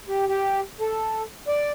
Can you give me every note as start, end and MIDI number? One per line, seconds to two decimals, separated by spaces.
0.08 0.25 67
0.28 0.60 67
0.81 1.22 69
1.48 1.72 74